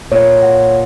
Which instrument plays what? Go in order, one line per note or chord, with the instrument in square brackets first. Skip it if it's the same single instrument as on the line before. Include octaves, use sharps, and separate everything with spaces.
[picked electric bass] A#2 [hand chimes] C#5
[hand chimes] F#5